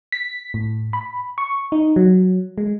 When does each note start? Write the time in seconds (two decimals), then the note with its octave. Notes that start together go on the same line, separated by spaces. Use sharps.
0.12 B6
0.54 A2
0.93 B5
1.38 C#6
1.72 D#4
1.96 F#3
2.58 G#3